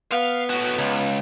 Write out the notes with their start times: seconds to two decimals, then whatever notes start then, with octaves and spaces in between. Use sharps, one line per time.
0.12 B3 F5
0.50 A2 F#4
0.78 C#2